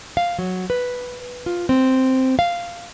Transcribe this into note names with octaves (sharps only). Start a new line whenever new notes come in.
F5
F#3
B4
F4
C4
F5